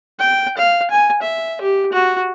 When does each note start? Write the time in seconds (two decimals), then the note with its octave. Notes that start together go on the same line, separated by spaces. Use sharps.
0.20 G5
0.58 F5
0.91 G#5
1.22 E5
1.61 G4
1.93 F#4